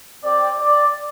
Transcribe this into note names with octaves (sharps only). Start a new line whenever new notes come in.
C4 G4 D5
D5